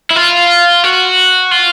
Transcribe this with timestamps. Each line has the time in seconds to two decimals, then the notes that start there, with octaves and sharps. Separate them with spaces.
0.11 E4
0.16 F4
0.84 F#4
1.51 F4